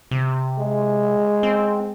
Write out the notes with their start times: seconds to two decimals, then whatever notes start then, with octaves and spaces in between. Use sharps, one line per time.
0.11 C3
0.58 G#3
1.43 C4